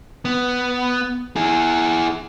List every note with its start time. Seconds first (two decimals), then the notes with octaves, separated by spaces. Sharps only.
0.25 B3
1.36 E4 G#4